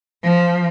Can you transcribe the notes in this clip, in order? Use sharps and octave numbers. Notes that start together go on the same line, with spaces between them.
F3